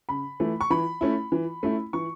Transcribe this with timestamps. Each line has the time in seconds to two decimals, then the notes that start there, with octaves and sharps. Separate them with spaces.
0.09 C#3 B5
0.40 E3 A3
0.61 C#6
0.70 E3 B5
1.01 A3 C#4 E4
1.32 E3
1.63 A3 C#4 E4
1.93 E3 C#6